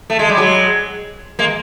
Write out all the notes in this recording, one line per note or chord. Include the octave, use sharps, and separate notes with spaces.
A3
G#3
G3
F#3 G#3
G#3 A#3